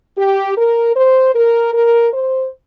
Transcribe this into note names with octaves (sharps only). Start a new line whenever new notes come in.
G4
A#4
C5
A#4
A#4
C5